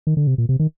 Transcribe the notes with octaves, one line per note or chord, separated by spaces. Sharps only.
D#3
D3
C3
A#2
C3
D#3